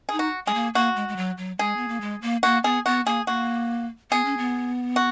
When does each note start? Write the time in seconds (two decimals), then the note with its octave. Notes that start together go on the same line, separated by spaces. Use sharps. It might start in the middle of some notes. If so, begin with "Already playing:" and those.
0.09 D#4 G#4
0.19 F#4
0.47 G#3 G#4
0.54 A#3
0.75 A#3 F#4
0.96 G#3
1.08 G#3
1.17 F#3
1.38 F#3
1.59 G#3 G#4
1.77 B3
1.88 A#3
2.01 G#3
2.22 A#3
2.43 A#3 F#4
2.64 B3 G#4
2.86 B3 F#4
3.06 A#3 G#4
3.27 A#3 F#4
4.11 B3 G#4
4.25 C#4
4.38 B3
4.96 F#4